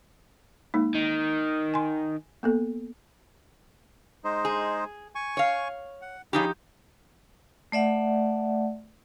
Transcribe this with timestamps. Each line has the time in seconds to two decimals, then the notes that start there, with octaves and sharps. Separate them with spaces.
0.74 G#3 A#3 D#4
0.95 D#3
1.74 G#5 C6
2.43 A#3 B3 A4
4.24 G#3 D#4 C5
4.45 G#4
5.15 G#5 C#6
5.37 C#5 F5
6.02 F#5
6.33 F3 C#4 D#4 G4 G#4 B5
7.72 A3 D5 E5 F#5